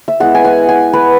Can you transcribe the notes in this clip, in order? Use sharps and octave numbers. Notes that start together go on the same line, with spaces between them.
E5
G#3 B3 E4 F#5
G#5
F#5
G#5
B4